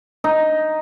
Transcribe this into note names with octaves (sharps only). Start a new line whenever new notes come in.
D#4